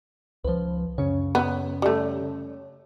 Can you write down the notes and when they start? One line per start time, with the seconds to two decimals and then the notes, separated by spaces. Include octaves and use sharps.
0.44 C#2 F3 B4 C5
0.98 F#2 C#3 C#4 C#5
1.35 B3
1.82 G3 A3